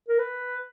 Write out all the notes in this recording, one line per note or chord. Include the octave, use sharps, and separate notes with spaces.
A#4
B4